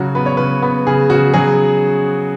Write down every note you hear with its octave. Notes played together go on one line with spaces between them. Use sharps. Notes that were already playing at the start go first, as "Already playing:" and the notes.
Already playing: C#3 F#3 F#4
B3 B4
C#5
C#3 B4
B3 B4
C#3 G#4
C#3 F#4
F#3 G#4